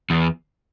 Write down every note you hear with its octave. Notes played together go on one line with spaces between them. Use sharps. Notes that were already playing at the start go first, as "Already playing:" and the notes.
E2